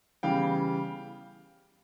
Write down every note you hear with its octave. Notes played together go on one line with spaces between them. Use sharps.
C#3 E3 G3 B3 F5 G5